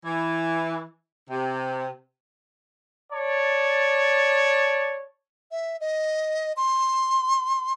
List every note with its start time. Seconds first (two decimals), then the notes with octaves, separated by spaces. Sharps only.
0.05 E3
1.30 C3
3.13 C#5 D5 A5
5.51 E5
5.81 D#5
6.57 C6